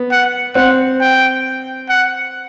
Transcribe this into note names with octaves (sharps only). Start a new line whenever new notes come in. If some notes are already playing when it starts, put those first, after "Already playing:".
Already playing: B3
F#5
C4 F#5
G5
F#5